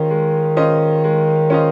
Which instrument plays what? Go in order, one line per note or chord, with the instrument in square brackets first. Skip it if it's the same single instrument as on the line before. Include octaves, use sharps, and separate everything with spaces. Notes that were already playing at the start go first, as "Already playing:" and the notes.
Already playing: [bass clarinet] D#3 [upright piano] G#3 C#4 F4 C5 D#5
[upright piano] G#3
C#4 F4 C5 D#5
G#3
C#4 F4 C5 D#5